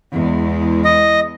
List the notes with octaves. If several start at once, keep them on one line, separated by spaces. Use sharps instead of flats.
E2 G#3
D#5